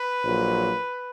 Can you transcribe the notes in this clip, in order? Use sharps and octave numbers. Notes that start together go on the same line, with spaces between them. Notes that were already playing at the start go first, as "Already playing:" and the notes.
Already playing: B4
A#1 A#2 F#3